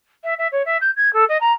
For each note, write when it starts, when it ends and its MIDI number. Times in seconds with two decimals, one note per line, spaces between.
0.24 0.34 76
0.38 0.47 76
0.52 0.62 73
0.65 0.77 76
0.81 0.91 91
0.96 1.12 92
1.13 1.24 69
1.29 1.37 75
1.40 1.52 82